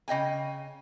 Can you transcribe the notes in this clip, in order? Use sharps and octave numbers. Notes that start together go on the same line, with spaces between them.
C#3 D#5 G5 G#5